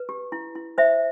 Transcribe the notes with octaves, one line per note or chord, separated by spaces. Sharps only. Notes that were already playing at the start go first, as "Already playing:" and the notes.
Already playing: B4
G4
E4
E4
C5 E5